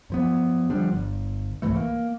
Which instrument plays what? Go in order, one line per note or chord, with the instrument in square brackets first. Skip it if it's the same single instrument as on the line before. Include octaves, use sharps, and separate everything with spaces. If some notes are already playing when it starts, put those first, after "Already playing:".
[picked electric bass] F#2 F3 B3
D3 F3 G3 D4
G1
C2 G#2 E3 A3
A#3